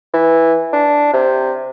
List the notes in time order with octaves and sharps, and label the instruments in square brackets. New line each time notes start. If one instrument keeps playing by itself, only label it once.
[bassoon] E3
D4
C3